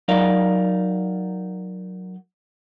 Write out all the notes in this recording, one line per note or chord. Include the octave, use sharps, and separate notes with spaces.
F#3 D#4 A#4 D5 F5